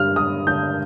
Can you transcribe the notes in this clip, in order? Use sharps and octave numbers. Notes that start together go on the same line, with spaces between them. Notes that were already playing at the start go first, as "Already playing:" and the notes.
Already playing: G2 G3 F6
G3 D#6
D4 G6